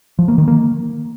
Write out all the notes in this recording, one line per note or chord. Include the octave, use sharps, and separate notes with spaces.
F3
A#3
D#3
A#3